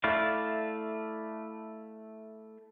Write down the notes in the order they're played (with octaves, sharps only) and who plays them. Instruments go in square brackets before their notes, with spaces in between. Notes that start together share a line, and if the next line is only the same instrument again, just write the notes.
[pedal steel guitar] A3 E4 D5 F5